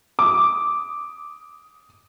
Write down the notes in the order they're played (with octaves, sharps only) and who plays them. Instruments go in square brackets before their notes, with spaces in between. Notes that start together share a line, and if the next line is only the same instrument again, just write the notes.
[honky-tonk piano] D6 D#6